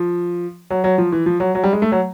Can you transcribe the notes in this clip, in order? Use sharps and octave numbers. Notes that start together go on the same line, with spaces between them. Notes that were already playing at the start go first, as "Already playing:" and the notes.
Already playing: F3
F#3
F#3
F3
E3
F3
F#3
F#3
G3
G#3
A3
F#3